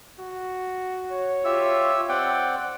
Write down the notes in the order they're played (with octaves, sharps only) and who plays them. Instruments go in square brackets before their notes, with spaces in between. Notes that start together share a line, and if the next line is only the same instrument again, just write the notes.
[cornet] F#4
[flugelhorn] C#5
[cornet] F4 [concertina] G4 E5 E6
[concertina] C4 D5 F#5 [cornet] G5